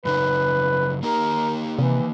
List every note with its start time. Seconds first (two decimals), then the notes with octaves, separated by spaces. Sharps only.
0.05 F#2 C#3 D#4 B4
1.03 A#3 D#4 G4 A#4
1.79 C3 E3